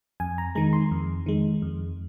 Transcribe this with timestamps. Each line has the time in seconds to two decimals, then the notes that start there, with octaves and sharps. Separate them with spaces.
0.20 F2 G#5
0.38 A#5
0.55 D#3 G#3 A#5
0.73 C6
0.91 F2
1.26 D#3 G#3
1.62 F2